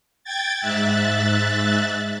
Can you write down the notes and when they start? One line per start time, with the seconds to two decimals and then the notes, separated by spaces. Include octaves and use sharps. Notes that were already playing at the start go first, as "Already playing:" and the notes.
0.24 G5 G#6 A6
0.59 G#2 E5 F#6 A6